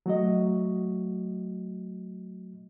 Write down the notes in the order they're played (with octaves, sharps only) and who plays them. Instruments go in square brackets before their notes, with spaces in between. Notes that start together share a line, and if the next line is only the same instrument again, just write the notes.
[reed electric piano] F#3 A3 F#4 D#5